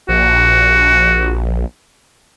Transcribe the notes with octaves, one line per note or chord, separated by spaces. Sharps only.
A#1 F#4